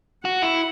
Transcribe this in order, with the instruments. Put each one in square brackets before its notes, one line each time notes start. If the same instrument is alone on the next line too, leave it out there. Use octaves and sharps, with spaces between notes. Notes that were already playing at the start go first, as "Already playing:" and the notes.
[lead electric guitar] F#4 [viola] F#5
[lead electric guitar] E4